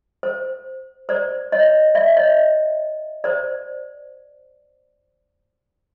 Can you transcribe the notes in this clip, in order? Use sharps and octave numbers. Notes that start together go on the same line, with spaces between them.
C5
C5 D5
C#5 D#5
D5 E5
C#5 D#5
C5 D5